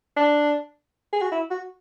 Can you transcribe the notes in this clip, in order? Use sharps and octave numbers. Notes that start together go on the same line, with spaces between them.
D4
G#4
F#4
E4
F#4